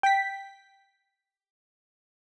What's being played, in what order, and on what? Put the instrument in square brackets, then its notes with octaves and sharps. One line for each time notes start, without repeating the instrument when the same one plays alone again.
[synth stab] G5 B6